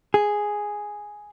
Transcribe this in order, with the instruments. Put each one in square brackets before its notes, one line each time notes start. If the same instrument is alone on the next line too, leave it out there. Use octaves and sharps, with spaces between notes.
[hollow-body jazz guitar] G#4